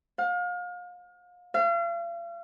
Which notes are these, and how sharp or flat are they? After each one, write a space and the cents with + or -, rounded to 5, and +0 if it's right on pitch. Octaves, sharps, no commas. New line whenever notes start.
F5 +35
F5 -40